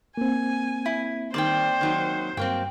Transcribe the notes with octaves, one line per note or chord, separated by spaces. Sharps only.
A#3 C4 G#5
E4
D#3 G3 C5 D5 G5
D#3 F#3 D#4
G2 F#3 A#3 C4 G5